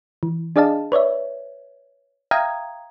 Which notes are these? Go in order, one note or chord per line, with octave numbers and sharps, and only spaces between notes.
E3
D4 G#4 D5 D#5 F5 A5
B4 C#5 D5 E5
E5 F5 G5 A#5 D#6 G#6